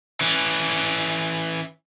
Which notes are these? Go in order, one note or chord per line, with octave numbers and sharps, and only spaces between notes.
E3 C#4